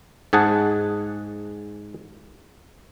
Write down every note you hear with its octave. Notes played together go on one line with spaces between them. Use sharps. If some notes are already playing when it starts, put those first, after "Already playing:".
G#2 G#4 F#5 A5